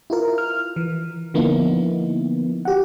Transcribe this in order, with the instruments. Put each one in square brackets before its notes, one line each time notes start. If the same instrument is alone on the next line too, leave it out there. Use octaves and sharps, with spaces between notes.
[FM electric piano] E4 F4 A#4
F6
E3
D3 F3 A#3 B3 D#4 E4
F#4 G4 F#5